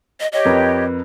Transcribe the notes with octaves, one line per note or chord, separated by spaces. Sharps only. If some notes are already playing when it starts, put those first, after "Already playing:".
D#5
G4 C#5 D#5
F2 A#4 B4